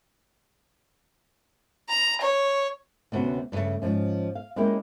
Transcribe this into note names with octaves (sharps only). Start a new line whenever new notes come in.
A#5
C#5
D2 C3 B3 C#4 F#4
G2 C#3 A3
G#2 F3 C#4
F5
G#3 A#3 C#4 E4 G4 A#4